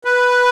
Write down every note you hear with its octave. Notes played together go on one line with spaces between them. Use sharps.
B4